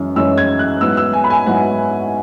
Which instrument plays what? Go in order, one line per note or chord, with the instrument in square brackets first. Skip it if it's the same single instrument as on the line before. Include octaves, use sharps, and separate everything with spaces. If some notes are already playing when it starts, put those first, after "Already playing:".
Already playing: [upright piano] F#2 E3 G#3 C#4 E4
F#2 E3 G#3 C#4 E4 E6
G#6
F#6
G#2 F#3 B3 E4 E6
E6
G#5
B5
G#5
G#2 F#3 B3 E4 F#5